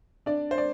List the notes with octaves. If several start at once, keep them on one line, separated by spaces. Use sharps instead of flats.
D4 D5
C5
D5